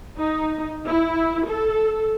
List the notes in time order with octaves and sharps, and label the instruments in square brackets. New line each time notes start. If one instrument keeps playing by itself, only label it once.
[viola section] D#4
E4
A4